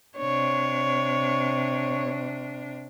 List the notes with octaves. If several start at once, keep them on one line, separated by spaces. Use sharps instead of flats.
C3 D4 C#5